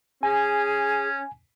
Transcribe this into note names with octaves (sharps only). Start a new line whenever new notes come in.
C#4 G#4 G#5